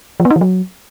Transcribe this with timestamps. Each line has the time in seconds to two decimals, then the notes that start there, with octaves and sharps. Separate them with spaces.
0.20 F3
0.25 B3
0.30 D#4
0.36 E3
0.41 F#3